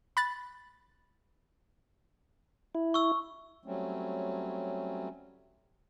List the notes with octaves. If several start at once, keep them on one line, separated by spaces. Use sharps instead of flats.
B5 F#6 A6
E4
C#6 E6
F#3 G3 A3 C4 C#4